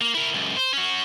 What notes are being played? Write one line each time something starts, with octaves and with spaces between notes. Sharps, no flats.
A#3
E4 A#4
C#2 F#2
C5
C#4 F#4